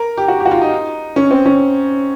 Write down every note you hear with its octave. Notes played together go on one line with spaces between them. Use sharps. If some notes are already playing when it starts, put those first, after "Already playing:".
Already playing: A#4
G4
F#4
G4
F#4
F4
D#4
C#4
C4
C#4